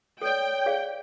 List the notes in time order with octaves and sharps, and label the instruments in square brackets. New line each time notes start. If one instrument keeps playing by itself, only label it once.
[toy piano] A4 D5 [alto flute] C#5 [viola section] G5
[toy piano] G#4 D5 F5